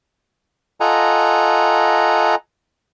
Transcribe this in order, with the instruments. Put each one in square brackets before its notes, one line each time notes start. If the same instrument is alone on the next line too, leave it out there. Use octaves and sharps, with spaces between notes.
[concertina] F4 A4 D#5 F#5 G#5 A#5